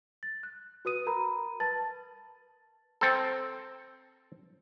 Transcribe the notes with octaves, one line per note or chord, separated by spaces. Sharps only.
A6
F#6
F#4 B4 D#6 D#7
A#4 A#5 B5
B4 A5 A6
C4 A4